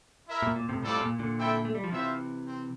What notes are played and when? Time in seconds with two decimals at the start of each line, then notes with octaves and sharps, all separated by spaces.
0.28 E4 A#4 E5
0.43 A#2
0.56 A#2
0.69 A2 C3
0.83 A2 G3 C4 F4 A4 D5
1.01 A#2
1.19 A#2 D3
1.38 C4 E4 A4 E5 G5
1.65 A3
1.75 G3
1.84 F3
1.92 C3 E3 C4 F4 C5 E5
2.46 C4